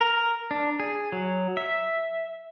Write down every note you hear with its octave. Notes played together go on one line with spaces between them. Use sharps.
A#4
D4
G#4
F#3
E5